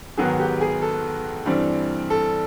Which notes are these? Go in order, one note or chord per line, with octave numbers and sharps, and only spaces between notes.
G#2 D#3 F#3 B3 G#4
G4
G#4
A4
G2 E3 G3 C4
A4